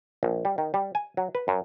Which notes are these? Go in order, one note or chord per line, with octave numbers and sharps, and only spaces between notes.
A#1
G3
D#3
G3
G#5
F#3
B4
F#2